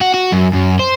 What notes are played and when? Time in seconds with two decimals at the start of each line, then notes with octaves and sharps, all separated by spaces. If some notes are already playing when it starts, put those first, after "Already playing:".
0.01 F#4
0.14 F#4
0.32 F#2
0.54 F#2
0.79 C5